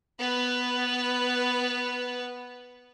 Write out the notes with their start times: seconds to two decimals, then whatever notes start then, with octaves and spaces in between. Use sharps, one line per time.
0.19 B3 B4